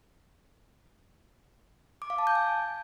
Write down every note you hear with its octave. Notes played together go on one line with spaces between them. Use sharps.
D6
F5
A5
G6
G#5